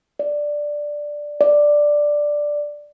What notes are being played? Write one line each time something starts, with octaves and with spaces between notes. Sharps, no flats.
D5
D5